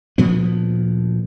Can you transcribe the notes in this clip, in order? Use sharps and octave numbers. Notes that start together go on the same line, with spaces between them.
D2 A#2 F3 B3